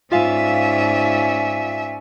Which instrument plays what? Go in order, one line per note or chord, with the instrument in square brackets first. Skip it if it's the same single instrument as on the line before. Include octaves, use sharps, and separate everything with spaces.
[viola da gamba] G#2 C#4 D5 [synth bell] F4 F5 [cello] E5 [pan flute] G#5